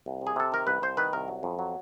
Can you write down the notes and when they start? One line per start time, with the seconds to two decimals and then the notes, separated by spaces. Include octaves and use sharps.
0.06 C2
0.22 C3
0.27 G#4
0.36 C3 A4
0.52 D#3 A#4
0.67 C2 B4
0.82 C2 C5
0.97 D#3 B4
1.13 C2 A#4
1.28 F#3
1.43 F2
1.59 F#3